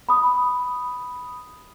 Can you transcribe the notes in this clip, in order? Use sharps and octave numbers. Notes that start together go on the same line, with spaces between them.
B5 D#6